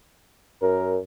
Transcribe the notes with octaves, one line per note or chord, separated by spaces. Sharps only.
F#2 A#4